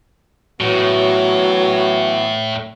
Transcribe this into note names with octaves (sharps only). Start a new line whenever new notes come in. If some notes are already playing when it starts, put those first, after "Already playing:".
A2 E3 F#3 B3